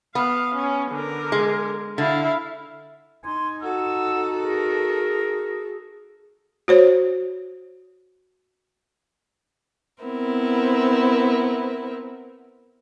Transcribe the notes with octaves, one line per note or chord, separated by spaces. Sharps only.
B3 F5
C#4
D3 A#4
G#3
D3 E4 F5
D#4 G#5 C6
F#4 A4 F#5 E6
G#4 A#4
F#4 C5 C#5
B3 C4 E4 A#4